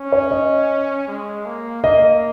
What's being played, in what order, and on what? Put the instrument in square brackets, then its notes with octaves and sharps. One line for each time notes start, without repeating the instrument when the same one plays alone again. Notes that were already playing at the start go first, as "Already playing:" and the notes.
Already playing: [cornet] C#4
[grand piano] C#5
D#5
[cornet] G#3
A#3
[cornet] A#3 [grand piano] D#5